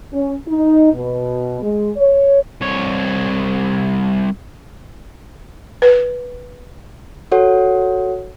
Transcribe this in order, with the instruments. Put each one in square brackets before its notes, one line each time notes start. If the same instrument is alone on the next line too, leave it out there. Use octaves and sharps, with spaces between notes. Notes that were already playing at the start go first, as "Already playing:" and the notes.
[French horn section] C#4
D#4
B2
G#3
C#5
[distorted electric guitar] C2 C#5
[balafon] B4
[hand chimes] F#4 A4 C#5 F#5